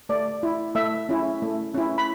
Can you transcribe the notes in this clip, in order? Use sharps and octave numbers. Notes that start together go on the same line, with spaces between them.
A3 D5
E4
A3 E5
C#4 E4
A3
C#4 E4
B5